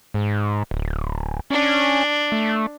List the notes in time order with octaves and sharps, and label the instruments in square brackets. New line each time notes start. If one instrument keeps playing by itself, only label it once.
[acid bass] G#2
D1
[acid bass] C#4 [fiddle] D4
[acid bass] A3